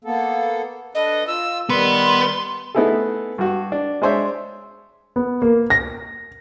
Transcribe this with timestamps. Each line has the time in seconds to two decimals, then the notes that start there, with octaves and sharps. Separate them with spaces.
0.05 A#3 B3 A4
0.95 D4 A4 B4 D#5
1.27 F4 E6
1.69 D#3 G3 B3 A#4 B4 C6
2.75 A3 B3 D#4 E4 G#4 A4
3.38 G2 F#4
3.72 D4
4.02 G#3 D4 C5 C#5 E5
5.16 B3
5.42 A#3
5.70 A#6